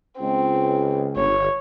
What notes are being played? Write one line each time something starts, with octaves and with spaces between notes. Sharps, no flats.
C#2 C4
G1 C#5